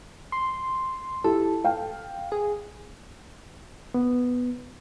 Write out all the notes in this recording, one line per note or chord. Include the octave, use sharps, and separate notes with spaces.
C6
E4 G4 A4
F5 G5
G#4
B3